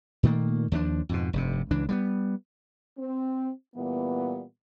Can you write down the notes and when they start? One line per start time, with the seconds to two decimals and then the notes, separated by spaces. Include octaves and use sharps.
0.23 A#2 D#3 A3 A#3
0.72 D#2 F3 D4
1.09 F2 G#2 B2
1.33 F1 G2 C3
1.71 C#2 E3 D4
1.89 G3 A#3 B3
2.98 C4
3.75 A#2 E3 G3 B3